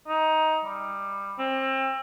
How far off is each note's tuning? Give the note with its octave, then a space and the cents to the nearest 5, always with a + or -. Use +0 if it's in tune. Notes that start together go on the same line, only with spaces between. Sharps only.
D#4 +15
G3 +20
C4 +30